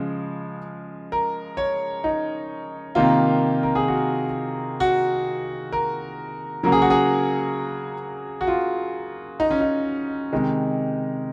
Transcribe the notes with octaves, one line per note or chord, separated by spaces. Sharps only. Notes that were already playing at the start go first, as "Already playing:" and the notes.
Already playing: C#3 F3 G#3
A#4
C#5
D#4
C3 D#3 A#3 F4
A#4
G#4
F#4
F#4
A#4
C#3 F#3 A#3 A#4
G#4
F#4
G#4
F#4
F4
D#4
C#4
D#4
C3 D#3 G#3